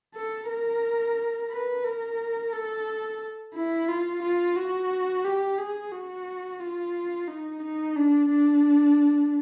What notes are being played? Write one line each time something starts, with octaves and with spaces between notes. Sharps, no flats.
A4
A#4
B4
A#4
A4
E4
F4
F4
F#4
G4
G#4
F#4
F4
D#4
D#4
D4
D4